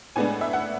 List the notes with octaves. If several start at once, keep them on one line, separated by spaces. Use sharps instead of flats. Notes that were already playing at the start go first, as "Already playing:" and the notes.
A2 G#3 B3 D4 G#5
E5
F#5